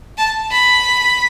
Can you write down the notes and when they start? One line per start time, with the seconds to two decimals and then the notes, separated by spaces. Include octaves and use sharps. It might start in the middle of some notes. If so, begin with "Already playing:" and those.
0.18 A5
0.52 B5